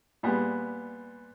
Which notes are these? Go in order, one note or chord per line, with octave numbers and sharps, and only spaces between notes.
A#2 G3 G#3 B3